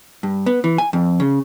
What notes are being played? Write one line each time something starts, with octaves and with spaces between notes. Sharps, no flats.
G2
B3
E3
G#5
F2
C#3